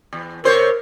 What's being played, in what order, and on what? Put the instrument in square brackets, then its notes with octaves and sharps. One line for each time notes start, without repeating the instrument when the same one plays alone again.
[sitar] E2
[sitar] C3 C5 C#5 [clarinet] A#4